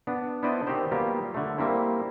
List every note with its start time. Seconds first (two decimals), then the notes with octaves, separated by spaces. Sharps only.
0.07 B3 D4
0.43 B3 D4 E4 C5 D5 D#5
0.67 D#3 C4 D#4 G4 C5
0.91 F#3 G3 A#3 B3 F4 G4
1.34 D3 A3
1.58 G3 A#3 C4 E4